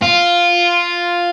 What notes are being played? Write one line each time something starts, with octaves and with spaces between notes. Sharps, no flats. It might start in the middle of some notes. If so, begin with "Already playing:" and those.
F4